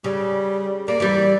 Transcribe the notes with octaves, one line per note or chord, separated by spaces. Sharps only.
C#3 G3
A#3 D5
E3 G3